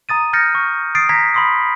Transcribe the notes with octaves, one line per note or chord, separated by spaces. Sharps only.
A#5 D#6 A6 D#7
F6 G6 A6 A#6 C#7
C#6
D#6 A6 C7 D7
A#5 G#6 A#6 B6
B5 C6 D#6